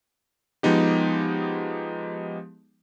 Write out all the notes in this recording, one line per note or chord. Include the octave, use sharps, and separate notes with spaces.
F3 G#3 B3 D#4 G4